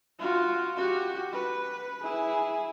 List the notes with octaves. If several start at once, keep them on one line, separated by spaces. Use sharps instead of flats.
F4 F#4
F#4 G4
B4
E4 G#4